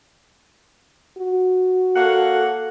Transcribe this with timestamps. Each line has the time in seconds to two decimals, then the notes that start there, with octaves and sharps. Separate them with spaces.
1.18 F#4
1.96 A#3 A4 C#5 F#5